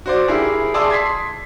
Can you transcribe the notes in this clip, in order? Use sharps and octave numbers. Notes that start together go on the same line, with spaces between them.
F#4 C5 D5
E4 G4 G#4 A#4
G#4 D5 A5 C6 D#6 E6
C6 G#6 B6 C7